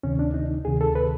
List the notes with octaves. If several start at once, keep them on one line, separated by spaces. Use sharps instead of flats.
D2 C3 D#3 C#4
D4
D#4
D2 C3 D#3 G#4
A4
B4